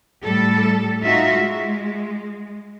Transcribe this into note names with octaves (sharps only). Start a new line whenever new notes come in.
A2 G3 A4
D#4 F4 F#4 E5
G#3